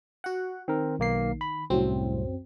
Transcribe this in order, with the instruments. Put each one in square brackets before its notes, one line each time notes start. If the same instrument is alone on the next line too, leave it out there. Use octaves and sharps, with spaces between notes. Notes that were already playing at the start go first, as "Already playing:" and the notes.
[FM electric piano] F#4 F#5
[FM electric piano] D#3 [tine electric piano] C4 A#4
[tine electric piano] B1 A#3 C7
B5
[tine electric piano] C2 A2 [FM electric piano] F#2 F#3 C4